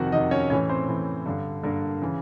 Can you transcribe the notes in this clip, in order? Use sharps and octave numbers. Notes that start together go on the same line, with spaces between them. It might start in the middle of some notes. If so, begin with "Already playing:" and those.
Already playing: F2 C3 D#3 F#4 F#5
F2 C3 D#3 D#4 D#5
C#4 C#5
A2 E3 C#4 C#5
C4 C5
A2 E3
G2 D3
G2 D3 A#3 A#4
C#3 E3